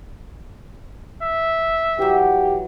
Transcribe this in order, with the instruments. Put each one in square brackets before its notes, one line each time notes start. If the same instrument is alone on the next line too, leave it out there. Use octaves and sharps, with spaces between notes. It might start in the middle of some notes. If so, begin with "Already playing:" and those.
[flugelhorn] E5
[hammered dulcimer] E3 F#3 [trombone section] G4